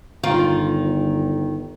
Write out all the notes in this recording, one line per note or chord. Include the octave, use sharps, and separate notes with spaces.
G1 D#3 F4